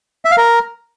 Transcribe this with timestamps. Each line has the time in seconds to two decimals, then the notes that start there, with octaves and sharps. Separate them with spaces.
0.25 E5
0.31 F5
0.37 A#4